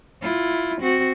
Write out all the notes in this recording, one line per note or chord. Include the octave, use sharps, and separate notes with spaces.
E4 F4
C4 F#4